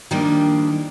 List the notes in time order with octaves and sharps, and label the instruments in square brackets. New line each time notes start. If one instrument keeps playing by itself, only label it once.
[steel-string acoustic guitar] D#3 F3 G3 A#3 D4